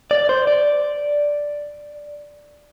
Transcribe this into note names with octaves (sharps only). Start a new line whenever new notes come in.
D5
C5
D5